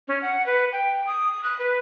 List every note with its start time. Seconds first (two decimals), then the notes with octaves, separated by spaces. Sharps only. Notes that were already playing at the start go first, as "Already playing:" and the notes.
0.08 C#4
0.22 F#5
0.46 B4
0.72 G5
1.07 D#6
1.44 F#6
1.59 B4